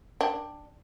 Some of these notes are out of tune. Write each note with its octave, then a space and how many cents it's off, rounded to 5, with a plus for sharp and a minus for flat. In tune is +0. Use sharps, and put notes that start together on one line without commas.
D4 +10 G5 +0